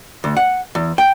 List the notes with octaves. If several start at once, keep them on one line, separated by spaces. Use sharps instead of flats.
D2
F#5
E2
G5